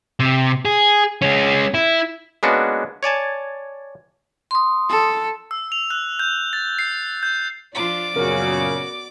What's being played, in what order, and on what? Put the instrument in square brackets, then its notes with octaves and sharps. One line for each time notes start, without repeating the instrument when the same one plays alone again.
[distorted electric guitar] C3
G#4
G#3 C#4
E4
[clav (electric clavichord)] G#3 A#3 B3 C#4 D4 F#4
C#5 D5 G#5 A5
[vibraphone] C6 D#6
[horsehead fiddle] A4
[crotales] E6
F7
F#6
G6
A6
C7
G6
[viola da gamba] F3 D4 F4 [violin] D5 D6
[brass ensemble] F#2 A#2 C#3 [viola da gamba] B3 F#4 [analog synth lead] A#4